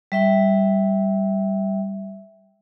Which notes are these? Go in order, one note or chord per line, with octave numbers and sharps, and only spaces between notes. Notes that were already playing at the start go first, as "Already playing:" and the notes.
G3 E5 G5